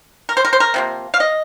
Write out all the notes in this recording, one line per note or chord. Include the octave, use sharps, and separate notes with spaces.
A#4
C5
A#4
C5
A#4
C3 F3 A#3
F5
D#5